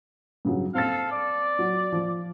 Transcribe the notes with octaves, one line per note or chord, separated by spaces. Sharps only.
G2 C#3 F#3
C4 A4 F5 A6
D5
F#3
F3